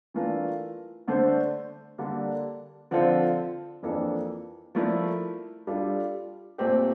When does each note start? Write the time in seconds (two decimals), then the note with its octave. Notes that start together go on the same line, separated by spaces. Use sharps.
0.14 E3 A3 D4 F4 A#4
1.08 D3 A3 D4 A4 C5
1.98 D3 G3 A#3 D4 A4
2.91 D3 F3 C4 F4 A4
3.83 F2 E3 A#3 D4 A4
4.75 F3 A3 E4 A#4 D5
5.67 G3 D4 F4 A4
6.58 A#2 A3 C4 G4